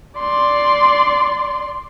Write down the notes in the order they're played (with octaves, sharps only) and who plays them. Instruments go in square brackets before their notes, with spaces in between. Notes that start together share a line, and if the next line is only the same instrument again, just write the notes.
[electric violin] D5 C6